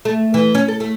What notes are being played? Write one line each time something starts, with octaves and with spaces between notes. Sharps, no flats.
A3
E3
C#4
A4
A3